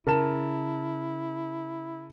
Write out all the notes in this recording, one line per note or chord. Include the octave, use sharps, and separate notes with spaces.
C#3 E4 A#4 A5 E7